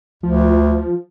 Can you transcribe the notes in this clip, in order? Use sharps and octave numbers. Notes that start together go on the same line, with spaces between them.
D2 F3